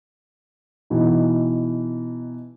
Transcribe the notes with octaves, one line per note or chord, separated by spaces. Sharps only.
B2 E3 D#4